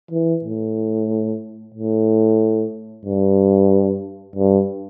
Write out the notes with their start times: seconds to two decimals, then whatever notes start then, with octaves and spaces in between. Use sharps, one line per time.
0.11 E3
0.44 A2
1.75 A2
3.06 G2
4.36 G2